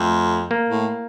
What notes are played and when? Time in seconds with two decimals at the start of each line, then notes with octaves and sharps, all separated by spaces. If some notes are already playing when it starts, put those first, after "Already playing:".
Already playing: F2 A3
0.51 A#3
0.69 A2